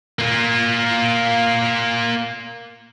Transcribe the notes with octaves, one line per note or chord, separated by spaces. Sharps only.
A#3 F4